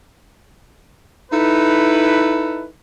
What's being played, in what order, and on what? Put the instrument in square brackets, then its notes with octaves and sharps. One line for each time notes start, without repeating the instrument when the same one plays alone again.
[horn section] D#4 E4 A4 B4